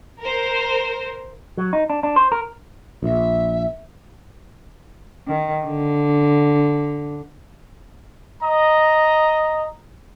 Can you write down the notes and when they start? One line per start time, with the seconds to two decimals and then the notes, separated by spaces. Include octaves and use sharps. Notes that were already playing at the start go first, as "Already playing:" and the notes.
0.21 A#4 C5
1.57 F#3
1.73 D#4
1.90 D4
2.03 D4
2.16 C5
2.32 A#4
3.03 A#1 E5
5.27 D#3
5.66 D3
8.43 D#5 A#5